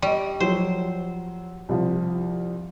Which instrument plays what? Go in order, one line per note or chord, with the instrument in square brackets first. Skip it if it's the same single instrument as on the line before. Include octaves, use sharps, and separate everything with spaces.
[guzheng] G3 [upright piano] D#5 C#6
[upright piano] F3 F#3 [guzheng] C5
[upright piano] C2 F3